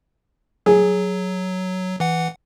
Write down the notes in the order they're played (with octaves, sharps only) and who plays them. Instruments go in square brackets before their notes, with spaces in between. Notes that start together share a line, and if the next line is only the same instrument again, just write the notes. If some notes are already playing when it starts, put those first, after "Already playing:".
[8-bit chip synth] F#3 [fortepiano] G#4
[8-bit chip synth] E3 F#5